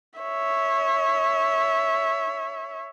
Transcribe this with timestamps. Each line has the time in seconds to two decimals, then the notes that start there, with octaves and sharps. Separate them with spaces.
0.19 C#5 E5